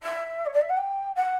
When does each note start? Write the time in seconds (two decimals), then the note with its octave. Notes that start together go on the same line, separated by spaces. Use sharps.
0.02 E5
0.45 C#5
0.53 D5
0.61 E5
0.69 F#5
0.77 G5
1.15 F#5